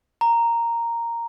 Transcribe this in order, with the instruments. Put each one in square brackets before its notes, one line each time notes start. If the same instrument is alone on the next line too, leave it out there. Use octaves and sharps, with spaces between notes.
[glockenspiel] A#5